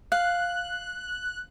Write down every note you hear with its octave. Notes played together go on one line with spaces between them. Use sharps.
F5 F#6